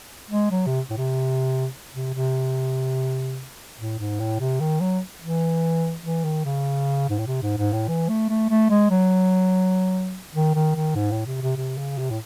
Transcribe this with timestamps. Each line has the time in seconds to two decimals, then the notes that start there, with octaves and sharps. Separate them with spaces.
0.30 G#3
0.51 F#3
0.66 C3
0.90 A2
0.97 C3
1.94 C3
2.14 C3
3.79 A2
3.99 G#2
4.19 A2
4.40 C3
4.61 D#3
4.81 F#3
5.22 E3
6.04 E3
6.24 D#3
6.45 C#3
7.09 G#2
7.18 A2
7.27 C3
7.42 G#2
7.57 G#2
7.73 A2
7.88 E3
8.09 A3
8.29 A3
8.50 A3
8.70 G#3
8.90 F#3
10.34 D#3
10.55 D#3
10.75 D#3
10.95 G#2
11.11 A2
11.26 C3
11.41 C3
11.57 C3
11.77 C#3
11.98 C3
12.10 A2